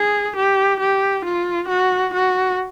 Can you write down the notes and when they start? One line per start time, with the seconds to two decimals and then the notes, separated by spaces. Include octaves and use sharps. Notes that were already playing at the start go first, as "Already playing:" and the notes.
Already playing: G#4
0.36 G4
0.80 G4
1.24 F4
1.68 F#4
2.13 F#4